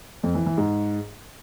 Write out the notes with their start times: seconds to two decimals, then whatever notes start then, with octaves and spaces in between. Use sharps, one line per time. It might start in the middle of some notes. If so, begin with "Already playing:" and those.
0.23 F2
0.35 E3
0.46 E3
0.58 G#2